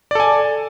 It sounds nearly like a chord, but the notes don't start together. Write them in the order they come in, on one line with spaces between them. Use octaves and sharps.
D5 A4 G#5